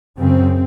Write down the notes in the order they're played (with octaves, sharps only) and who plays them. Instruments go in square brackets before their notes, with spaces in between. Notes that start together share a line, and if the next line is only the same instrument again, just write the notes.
[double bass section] F#2 C#3 C4